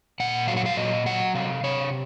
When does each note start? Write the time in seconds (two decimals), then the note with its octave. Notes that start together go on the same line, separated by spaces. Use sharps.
0.20 A#2 F#5
0.48 F#3 F5
0.57 F#5
0.66 F5
0.77 A#2 D#5
1.06 F#3 F#5
1.34 C3 F5
1.64 C3 C#5